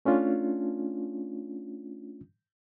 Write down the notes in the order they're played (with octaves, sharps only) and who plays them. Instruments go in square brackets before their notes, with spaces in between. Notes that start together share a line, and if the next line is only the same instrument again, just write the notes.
[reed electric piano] A3 C#4 D4 F4